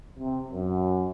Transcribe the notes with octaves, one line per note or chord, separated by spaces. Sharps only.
C3
F#2